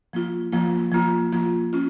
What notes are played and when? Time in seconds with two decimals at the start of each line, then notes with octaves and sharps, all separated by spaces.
0.13 F3 A#3 F4
0.52 F3 A#3 F4
0.92 F3 A#3 F4
1.32 F3 A#3 F4
1.73 C#4 F4